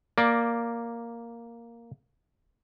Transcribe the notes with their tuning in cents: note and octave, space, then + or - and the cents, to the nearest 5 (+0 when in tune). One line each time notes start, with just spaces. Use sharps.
A#3 +0 D5 +0